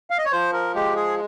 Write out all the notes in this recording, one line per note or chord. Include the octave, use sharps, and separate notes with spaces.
F5
D#5
C#5
F3 C5
A#4
G#3 G4
G#4